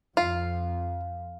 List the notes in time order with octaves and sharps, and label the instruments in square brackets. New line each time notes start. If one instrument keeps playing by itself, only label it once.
[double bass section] F2 [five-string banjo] F4 [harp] F5